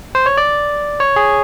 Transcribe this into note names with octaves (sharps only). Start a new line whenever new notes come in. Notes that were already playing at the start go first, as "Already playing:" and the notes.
C5
C#5
D5
C#5
G#4